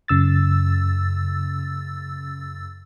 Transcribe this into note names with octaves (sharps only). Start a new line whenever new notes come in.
F#2 C#3 E6 A6